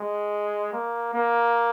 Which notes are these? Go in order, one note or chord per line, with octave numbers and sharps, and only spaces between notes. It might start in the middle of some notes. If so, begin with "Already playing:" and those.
Already playing: G#3
A#3
A#3